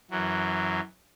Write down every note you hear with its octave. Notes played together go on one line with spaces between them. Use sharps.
F#2 E3 F#3